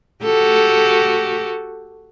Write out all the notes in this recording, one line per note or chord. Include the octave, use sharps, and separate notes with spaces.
F#4 G4 A4